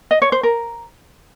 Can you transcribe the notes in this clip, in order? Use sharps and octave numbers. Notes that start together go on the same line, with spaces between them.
D#5
C#5
C5
A#4